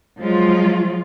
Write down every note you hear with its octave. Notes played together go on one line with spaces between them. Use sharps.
F3 F#3 G#3 F4